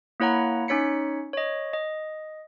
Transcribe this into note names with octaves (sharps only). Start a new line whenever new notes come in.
A#3 E4 C#5 F#5 A#5
C#4 D#4 C#5 B6 C#7
C#5 D#5
D#5